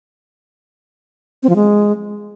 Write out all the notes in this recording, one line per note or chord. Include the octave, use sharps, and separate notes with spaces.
C4
F3
G#3